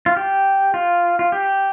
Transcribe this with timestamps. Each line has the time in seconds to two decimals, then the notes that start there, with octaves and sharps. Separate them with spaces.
0.06 F4
0.17 G4
0.74 F4
1.19 F4
1.32 G4